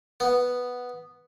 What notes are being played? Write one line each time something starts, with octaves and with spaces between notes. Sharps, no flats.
B3